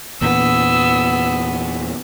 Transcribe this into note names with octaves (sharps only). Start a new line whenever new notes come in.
E2 A#2 E3 B3 E6